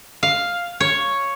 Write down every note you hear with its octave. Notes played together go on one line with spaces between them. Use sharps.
F5
C#5